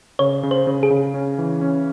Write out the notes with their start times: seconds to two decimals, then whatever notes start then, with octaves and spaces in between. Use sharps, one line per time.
0.19 C#3 C#5
0.43 C#3
0.51 C5
0.67 C#3
0.83 G#4
0.90 C#3
1.14 C#4
1.38 E3
1.61 C#4